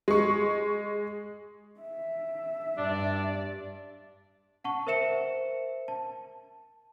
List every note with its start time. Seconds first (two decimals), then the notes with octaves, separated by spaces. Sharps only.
0.08 G#3 C#6
1.80 E5
2.77 G2 D4 D5
4.64 F#5 A5 C#6
4.87 A#4 C5 E5 C#7 E7
5.88 A5